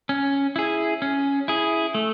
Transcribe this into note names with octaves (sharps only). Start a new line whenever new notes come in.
C#4
E4 G#4
C#4
E4 G#4
A3